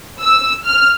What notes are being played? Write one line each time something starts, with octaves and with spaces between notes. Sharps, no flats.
E6
F6